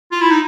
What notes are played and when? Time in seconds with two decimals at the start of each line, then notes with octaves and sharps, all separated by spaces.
0.12 F4
0.21 E4
0.31 D#4